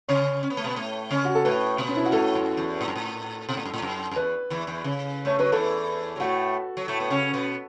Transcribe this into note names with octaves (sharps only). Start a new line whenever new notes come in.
C#3 C#4 C#5
C#4
B3
A3
B2 B3
A2 A3
C#3 C#4
F#4
A4
A2 A3 B4
B2 B3
C#4
E4
F#4
A2 A3 A4
F#2
E2
A2
F#2
A2
B2
A2
F#2
A2
F#2
F#2
E2 B4
E2 E3
E2 E3
C#3
A3 C#5
F#3 B4
E2 E3 A4
F#3
A2 A3 F#4
F#3
A2 A3
B3
C#3 C#4
B2 B3